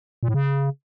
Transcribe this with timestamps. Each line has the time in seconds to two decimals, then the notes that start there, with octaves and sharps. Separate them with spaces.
0.23 A#2
0.28 A2
0.34 C#3